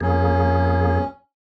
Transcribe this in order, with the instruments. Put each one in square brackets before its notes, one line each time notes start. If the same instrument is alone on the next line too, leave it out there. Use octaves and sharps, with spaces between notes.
[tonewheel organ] F2 A#3 G#4 [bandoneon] C#4